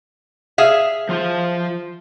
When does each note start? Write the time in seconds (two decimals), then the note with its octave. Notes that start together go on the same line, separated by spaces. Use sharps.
0.58 G#4 E5 F5
1.09 F3 F4 C5